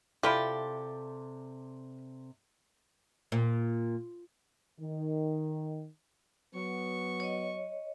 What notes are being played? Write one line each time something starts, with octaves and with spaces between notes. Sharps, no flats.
C3 E4 F4 G4 A4 D5
A#2
D#3
F#3 B3 C#6
C#5 D#5